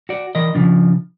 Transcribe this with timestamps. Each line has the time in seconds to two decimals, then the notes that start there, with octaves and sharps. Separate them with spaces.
0.09 F#4 D5
0.35 E3 A#4 D5 D#5
0.55 C#3 F3 D4